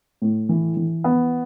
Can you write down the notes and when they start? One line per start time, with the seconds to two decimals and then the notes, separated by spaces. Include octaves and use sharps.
0.22 A2
0.49 E3
0.77 E3
1.04 B3